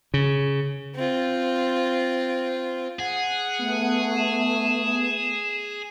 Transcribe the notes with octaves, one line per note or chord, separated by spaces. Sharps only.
C#3
C4 F4
G#4 F#5
A3 B3
E7